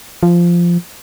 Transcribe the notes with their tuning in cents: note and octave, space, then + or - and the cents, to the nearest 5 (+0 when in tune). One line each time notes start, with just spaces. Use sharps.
F3 -10